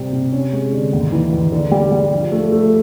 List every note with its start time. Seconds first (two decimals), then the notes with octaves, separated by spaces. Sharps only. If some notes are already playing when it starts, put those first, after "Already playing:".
Already playing: C3 G3 C4
0.13 C3
0.32 C#4
0.53 G#3
0.72 D3
0.93 D#2
1.12 E3
1.33 D#2
1.52 D3
1.71 G3
1.92 G3
2.12 F3
2.32 A3
2.52 A3